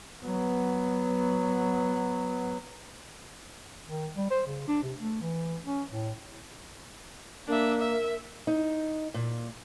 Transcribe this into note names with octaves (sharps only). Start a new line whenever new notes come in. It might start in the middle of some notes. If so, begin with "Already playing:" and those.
F#3 B3
D#3
G3
C5
C#3
D4
C3
A3
E3
C#4
A2
A#3 D4 A#4 E5
E5
D#4
A#2